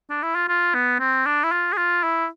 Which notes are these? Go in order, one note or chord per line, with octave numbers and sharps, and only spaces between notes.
D4
E4
F4
F4
B3
C4
D4
E4
F4
G#4
F4
E4